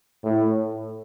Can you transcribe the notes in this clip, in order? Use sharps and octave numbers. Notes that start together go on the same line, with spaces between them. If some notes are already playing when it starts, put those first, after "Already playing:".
A2